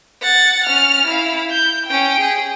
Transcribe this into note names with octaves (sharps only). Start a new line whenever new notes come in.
F#5 A6
C#4 F6
E4 F5
G6
C#4 G5
G#4